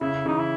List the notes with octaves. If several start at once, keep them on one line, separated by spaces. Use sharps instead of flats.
C#3 E4
C#3 E3 D#4
E4